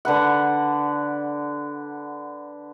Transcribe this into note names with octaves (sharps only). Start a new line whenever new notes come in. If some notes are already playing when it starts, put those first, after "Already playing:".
D3 B4 F#5